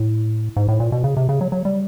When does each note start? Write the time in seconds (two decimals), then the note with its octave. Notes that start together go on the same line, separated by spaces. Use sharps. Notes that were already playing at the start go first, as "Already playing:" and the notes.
Already playing: A2
0.56 G#2
0.68 A2
0.80 A#2
0.92 B2
1.04 C#3
1.17 C3
1.29 C#3
1.41 F#3
1.52 F#3
1.65 G3